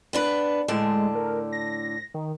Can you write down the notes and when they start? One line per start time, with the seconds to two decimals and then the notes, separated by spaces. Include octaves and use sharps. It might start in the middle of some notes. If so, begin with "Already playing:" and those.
0.13 B3 D4 B4
0.68 A2 D3 G#3 A5
1.15 A#4
1.52 A#6
2.14 D#3